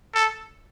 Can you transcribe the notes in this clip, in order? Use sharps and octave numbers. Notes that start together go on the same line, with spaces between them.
A4